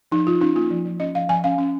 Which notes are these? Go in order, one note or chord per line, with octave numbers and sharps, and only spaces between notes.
F3 D#4
F3 F4
C#4 D#4
A#3 F4
F3
F3
C#4 D#5
F3 F5
F3 G#5
C#4 F5
C#4